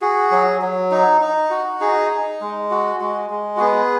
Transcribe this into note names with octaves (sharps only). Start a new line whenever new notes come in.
F#4 G#4
F#3
F#3
D#4
D#4
F#4
D#4 G#4
D#4
G#3
F#4
G#3 F#4
G#3
F#4
B3 G#4